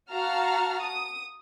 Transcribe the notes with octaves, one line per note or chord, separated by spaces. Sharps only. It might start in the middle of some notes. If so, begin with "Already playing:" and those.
F#4 F5 F#5 A5 A#5 F6
D#6